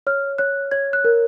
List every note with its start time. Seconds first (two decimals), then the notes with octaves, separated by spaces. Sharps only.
0.07 C#5 F6
0.38 C#5 F#6
0.71 C#5 G#6
0.93 F#6
1.04 A#4